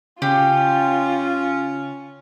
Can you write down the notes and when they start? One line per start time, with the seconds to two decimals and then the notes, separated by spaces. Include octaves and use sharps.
0.22 C#3 C#4 F4 G4